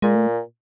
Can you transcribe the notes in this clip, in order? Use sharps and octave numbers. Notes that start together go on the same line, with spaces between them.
A#2 G#3
A3